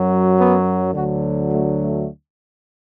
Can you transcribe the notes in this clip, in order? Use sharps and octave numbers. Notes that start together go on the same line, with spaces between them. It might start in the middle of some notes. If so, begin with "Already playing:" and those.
Already playing: F#2 F#3
B3
D2 D3 F#3 F#4
A3
A3